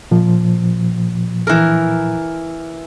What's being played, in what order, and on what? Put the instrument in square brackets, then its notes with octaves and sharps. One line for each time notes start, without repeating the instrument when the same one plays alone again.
[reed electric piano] A#2 F3
[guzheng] E3 A#4